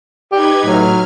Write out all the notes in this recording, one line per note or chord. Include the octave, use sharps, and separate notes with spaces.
D#4 G4 B4 G#6
A2 F#3 F6